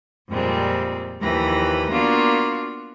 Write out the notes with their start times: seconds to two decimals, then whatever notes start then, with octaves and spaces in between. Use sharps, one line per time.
0.28 F2 A#2 G3 G#3 C4
1.20 D#2 E3 F3 G4 B4 A#6
1.90 A#3 B3 D4 F4 F#4